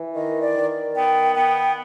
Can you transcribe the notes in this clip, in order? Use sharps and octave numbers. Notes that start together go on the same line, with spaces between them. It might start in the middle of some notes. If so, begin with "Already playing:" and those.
Already playing: E3
D#3 D#5
D5
D#3
B3 G5
B3 G5